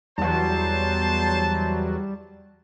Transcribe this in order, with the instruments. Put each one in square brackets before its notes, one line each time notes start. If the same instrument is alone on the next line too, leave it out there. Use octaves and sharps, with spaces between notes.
[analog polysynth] E2 F#3 [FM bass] G3 [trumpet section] C5 A5